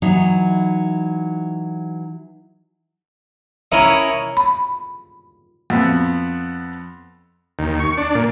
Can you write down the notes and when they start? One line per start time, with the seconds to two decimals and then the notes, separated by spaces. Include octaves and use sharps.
0.02 E3 F#3 D#4
3.72 C#4 E4 A#4 D#5
4.37 B5
5.70 F2 B3
7.59 D#2
7.80 C#6
7.97 D4
8.15 A#2